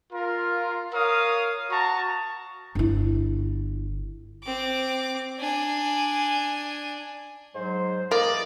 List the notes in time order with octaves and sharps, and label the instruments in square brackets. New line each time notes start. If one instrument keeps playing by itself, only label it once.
[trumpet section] F4 A#4
A#4 C#5 F5 D#6
F#4 A5 A#5 C#6
[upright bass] G1 E4
[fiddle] C4 D6
D4 G#5
[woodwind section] G#2 F#3 [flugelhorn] C5
[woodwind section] E3 D#6 [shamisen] A#3 [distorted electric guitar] D5 [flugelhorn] D#5